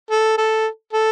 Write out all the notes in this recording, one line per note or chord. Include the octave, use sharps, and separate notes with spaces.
A4
A4
A4